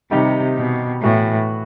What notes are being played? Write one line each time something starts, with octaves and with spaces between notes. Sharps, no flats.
C3 D#3 G3 D#4 G4
B2
A2 E3 B3 F#4